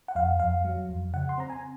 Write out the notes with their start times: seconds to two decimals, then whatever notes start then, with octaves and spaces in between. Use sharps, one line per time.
0.08 F#5
0.15 F2 F5
0.40 F2 F5
0.65 F#3
0.89 F2
1.13 C#3 F#5
1.29 C6
1.38 C4 A#5
1.50 G#5